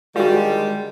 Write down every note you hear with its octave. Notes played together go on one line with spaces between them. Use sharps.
D3 D#3 G3 G#3 F4 F#4